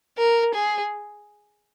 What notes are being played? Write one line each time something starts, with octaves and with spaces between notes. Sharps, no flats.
A#4
G#4